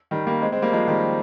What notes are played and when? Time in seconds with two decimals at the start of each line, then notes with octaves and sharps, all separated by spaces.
0.11 D#3 G3
0.27 G3 A#3
0.41 G#3 C4
0.52 G#3 C4
0.62 G3 A#3
0.73 F3 G#3
0.88 D#3 G3